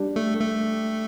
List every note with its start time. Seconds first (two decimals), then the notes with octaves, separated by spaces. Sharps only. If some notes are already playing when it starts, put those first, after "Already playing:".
Already playing: G3 D4 G4
0.16 A3
0.41 A3